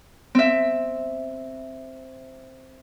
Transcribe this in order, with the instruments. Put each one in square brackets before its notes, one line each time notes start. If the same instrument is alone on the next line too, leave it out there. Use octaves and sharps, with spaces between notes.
[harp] C4 E5